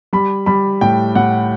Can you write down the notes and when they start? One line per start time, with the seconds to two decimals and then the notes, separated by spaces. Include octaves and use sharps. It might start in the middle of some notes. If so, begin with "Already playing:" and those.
0.13 G3 B5
0.46 G3 B5
0.81 A2 G5
1.15 A2 F#5